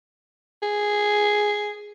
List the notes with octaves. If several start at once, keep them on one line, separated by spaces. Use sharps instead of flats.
G#4